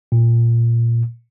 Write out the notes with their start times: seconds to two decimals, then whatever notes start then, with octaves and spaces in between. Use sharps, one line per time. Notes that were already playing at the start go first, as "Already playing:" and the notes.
0.12 A#2